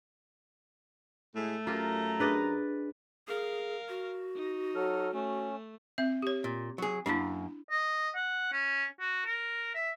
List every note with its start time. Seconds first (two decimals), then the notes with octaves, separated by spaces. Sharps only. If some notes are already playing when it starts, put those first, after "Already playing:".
1.36 A2 G#3 A3 G#4
1.67 F#2 F4 G4 A#4 A#5
2.20 D4 G#4 B4 D5 D#5
3.28 G#4 A#4 F5
3.89 F#4
4.36 D#4
4.75 F#3 A4 F6
5.14 A3 C#4
5.98 C4 E5
6.22 G4 C#5
6.44 A#2
6.78 F#3 G#4
7.06 F#2 A#3 D4 E4 A5
7.71 D#5
8.15 F#5
8.52 C#4
9.00 F#4
9.25 A#4
9.75 E5